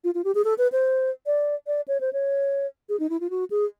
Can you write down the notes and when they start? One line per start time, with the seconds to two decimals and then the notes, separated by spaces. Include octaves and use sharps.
0.04 F4
0.15 F4
0.24 G4
0.35 G#4
0.45 A4
0.58 B4
0.72 C5
1.26 D5
1.67 D5
1.88 C#5
2.01 C5
2.13 C#5
2.89 G#4
3.00 D#4
3.10 E4
3.21 F4
3.30 F#4
3.50 G#4